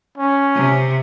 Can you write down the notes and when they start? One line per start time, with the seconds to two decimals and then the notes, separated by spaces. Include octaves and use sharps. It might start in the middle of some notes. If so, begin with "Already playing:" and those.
0.18 C#4
0.54 C3